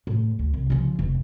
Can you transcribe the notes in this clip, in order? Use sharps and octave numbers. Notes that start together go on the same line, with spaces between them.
A2
D2
C2
C#3 F3
F1 E2